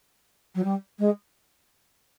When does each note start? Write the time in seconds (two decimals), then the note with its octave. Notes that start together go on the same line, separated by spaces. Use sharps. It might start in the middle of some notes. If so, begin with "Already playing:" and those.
0.55 F#3
0.64 G3
0.99 G#3